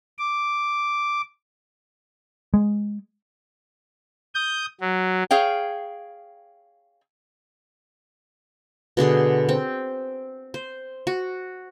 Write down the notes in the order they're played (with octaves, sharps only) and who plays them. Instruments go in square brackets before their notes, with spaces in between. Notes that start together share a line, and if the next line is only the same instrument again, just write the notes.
[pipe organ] D6
[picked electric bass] G#3
[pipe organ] D#6 G6
F#3
[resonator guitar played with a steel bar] G#4 C#5 F5 G5
[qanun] B2 D3 G#4 C6
C4
C5
F#4